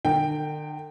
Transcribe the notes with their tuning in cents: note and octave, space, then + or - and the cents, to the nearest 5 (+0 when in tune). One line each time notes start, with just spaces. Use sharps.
D3 +45 A#3 +0 G5 +0